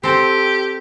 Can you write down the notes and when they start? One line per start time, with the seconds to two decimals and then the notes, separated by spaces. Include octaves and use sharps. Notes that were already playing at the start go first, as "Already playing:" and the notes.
0.03 C4 G4 A4